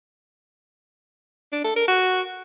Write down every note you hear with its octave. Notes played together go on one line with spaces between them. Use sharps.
D4
A4
A#4
F#4